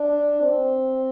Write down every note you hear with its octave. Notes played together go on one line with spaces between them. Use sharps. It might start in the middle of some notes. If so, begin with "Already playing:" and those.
Already playing: D4
C4